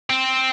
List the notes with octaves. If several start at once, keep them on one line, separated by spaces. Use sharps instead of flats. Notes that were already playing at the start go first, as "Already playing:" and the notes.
C4